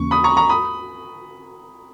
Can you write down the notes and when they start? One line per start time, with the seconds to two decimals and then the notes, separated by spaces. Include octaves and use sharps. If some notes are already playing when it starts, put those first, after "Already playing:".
Already playing: D#2 C#3 E3 A#3 C#4 C#6
0.11 B5 D#6
0.24 A#5 C#6
0.37 A#5 C#6
0.49 B5 D#6